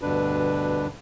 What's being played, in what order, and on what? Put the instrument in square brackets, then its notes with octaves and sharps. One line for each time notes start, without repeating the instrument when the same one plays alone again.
[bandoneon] D2 G2 B2 D3 D4 B4